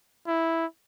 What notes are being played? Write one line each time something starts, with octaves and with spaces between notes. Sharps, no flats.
E4